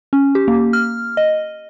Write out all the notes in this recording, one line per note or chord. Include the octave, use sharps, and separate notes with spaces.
C#4
G4
A#3
F6
D#5